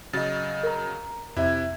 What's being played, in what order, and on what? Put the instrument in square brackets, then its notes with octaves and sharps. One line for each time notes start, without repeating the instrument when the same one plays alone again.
[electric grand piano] C#3 F#3 [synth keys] D#5 A6
[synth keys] A#4 A#5
[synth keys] F2 E5 G#6 [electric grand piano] C3 E4